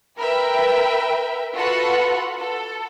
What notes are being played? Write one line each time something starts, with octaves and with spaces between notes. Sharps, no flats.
A#4 B4 E5 G5
F4 F#4 A4 B4 F#5
A4